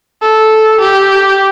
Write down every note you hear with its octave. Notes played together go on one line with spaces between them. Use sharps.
A4
G4